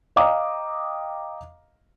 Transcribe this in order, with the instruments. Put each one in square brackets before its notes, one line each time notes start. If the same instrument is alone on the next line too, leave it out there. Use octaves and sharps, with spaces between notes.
[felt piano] D#5 F5 G5 A#5 D6 D#6